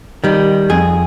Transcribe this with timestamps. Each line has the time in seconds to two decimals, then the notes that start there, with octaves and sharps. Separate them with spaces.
0.24 D#3 G3
0.70 F2 G#4